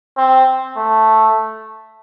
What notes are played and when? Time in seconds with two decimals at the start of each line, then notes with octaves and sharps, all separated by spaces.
0.17 C4
0.77 A3